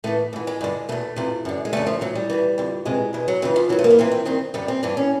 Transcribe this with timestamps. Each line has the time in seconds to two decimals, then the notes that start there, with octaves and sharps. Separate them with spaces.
0.04 A2 E3 A3
0.33 G#2 E3
0.47 G#3
0.61 G2 D3
0.89 E2 B2 A3
1.16 F2 C3 E3
1.45 F#2 D3
1.65 G#3
1.73 F#2 D3 A3
1.87 F3
2.01 A2 E3 F#3
2.15 G3
2.30 A2 E3
2.58 F2 D3
2.85 F2 C3 E3 G#3
3.13 E2 B2 G#3
3.28 F#3
3.42 F2 C#3 E3 F#3
3.56 F3
3.69 G#2 E3 F#3
3.79 A3
3.84 A#3
3.91 B3
3.98 F2 C3 E3 C4
4.12 C4
4.25 G2 D#3 C4
4.54 F#2 D3 G3
4.68 C4
4.83 G2 E3 D4
4.97 C#4